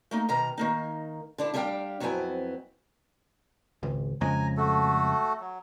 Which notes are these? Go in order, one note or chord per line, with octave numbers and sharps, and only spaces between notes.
A3 A#3 D#4
B2 D#3 A#5
D#3 A#3 D#4
D3 D4 E4
G3 D4 G#4 E5 F5 G5
F2 F#3 B3 C4 E4 G#5
G#1 C#2
F2 C#3 G#3 G#5 A#5
A3 F#4 A4
F#3